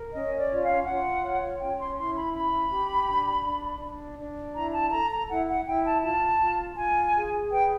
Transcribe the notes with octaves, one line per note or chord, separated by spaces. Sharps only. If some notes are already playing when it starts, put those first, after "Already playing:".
Already playing: A#4
C#4 D#5
D5
F4
F5
F4 F#5
C#5
C#4 G5
C6
E4 C6
B5
C#4 B5
G4
D4
D4
D4
D4
E4 A#5
A5
A4 A#5
A#5
E4 F#5
F#5
E4 G5
A5
F4 A5
F4
F4 G#5
G#4
B4 G5